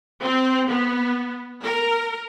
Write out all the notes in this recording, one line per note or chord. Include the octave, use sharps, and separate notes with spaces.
C4
B3
A#4